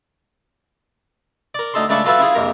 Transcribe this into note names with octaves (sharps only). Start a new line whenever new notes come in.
A#4 D5
D2 D#4 A4 C6
C#2 A3 D4 A4 B5 C#6
F#3 F4 A4 B4 C#5 E5
C#4 E4 F4 G#4
A#1 F2 C3 A#4